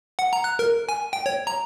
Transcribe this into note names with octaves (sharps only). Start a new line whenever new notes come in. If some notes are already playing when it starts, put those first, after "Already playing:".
F#5
A#5
F#6
A#4
G#5
G5
C#5
A#5